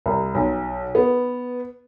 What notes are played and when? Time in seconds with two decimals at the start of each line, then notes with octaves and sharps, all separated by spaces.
0.06 C2
0.35 B1
0.95 B3